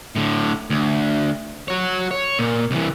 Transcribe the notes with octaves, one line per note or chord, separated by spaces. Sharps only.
A2 D3
D2
F#4 C#5
C#5
A#2
C2 E3